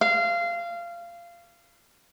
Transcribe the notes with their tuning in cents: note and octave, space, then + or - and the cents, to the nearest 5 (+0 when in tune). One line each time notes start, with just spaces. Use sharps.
F5 -20